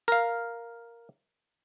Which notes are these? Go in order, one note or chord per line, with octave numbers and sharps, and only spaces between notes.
A#4 F5